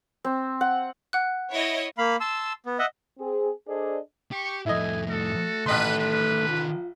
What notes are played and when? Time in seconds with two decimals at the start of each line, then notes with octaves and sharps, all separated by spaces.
0.24 C4
0.61 F#5
1.13 F#5 F#6
1.53 E4 C#5 D#5
1.98 A#3 F5 B5
2.20 A5 C6 E6
2.66 B3
2.79 D#5 E5 F#5
3.19 C4 G#4
3.68 D4 G#4 A4 C5 D5 D#5
4.32 G4 C#6
4.66 F2 A2 E4 A4 B4 D#5 G#5
5.08 A3 F#4 A4
5.66 A1 D#3 A4 B4 D#5 C6
5.98 B4
6.49 F4